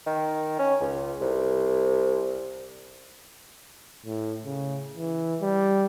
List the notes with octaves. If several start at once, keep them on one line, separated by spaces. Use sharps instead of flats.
D#3
C#4
C#2
C2
A2
C#3
E3
G3